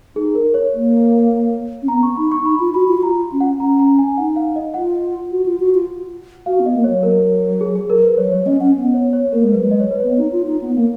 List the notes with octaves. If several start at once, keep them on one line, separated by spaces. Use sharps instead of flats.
D#4 G#4
A#4
C#5
A#3
C#4
B3 A#5
C#6
D#4 B5
C#6
D#4 B5
F4
F#4 B5
F4
F#4
F4 A#5
C#4
F#5
C#4 A#5
A#5
G#5
D#4 F#5
F5
D#5
F4 F#5
F#4
F4
F#4
F4
F#4 F5
B3
D#5
A#3
C#5
F#3
A#4
G#4
G#4
A#4
B4
F#3 C#5
F#3 C#5
C#4 D#5
C#4 F#5
B3
C#5
C#5
A#3 A#4
G#3
F#3 B4
G#3
D#5
C#5
B4
B3 C#5
D#4
F4
D#4
B3
A#3